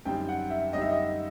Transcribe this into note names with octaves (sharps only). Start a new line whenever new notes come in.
F#2 D3 G3 C4 D#4 G5
F#5
E5
F#2 D3 G3 C4 D#4 D#5
E5
D#5